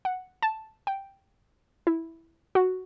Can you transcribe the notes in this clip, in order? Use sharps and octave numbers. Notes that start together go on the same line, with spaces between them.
F#5
A5
G5
E4
F#4